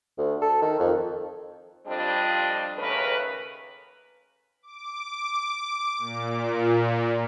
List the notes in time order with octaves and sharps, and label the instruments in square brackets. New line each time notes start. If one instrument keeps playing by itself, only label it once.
[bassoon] D2
A4
D#3
F2
[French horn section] F2 G3 C4 D4 F4 D#5
D#2 C#3 A3 A#4 B4
[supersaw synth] D6
A#2